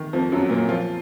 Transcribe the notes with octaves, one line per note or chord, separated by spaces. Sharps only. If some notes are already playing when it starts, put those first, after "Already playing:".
Already playing: D#3
F2 F3
F#2 F#3
A#2 A#3
F3 F4